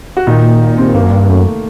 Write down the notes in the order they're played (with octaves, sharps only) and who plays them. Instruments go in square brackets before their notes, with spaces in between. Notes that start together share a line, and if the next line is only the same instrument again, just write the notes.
[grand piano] F#4
[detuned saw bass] A#2 [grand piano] D#3 D#4
[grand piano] C3 C4
[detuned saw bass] G2 [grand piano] A#3
[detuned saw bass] F#2
G2
[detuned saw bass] F#2 [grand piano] A3